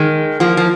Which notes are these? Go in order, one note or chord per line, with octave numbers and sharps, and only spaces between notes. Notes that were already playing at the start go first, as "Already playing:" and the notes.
Already playing: D#3 G#3
F3 A#3
F3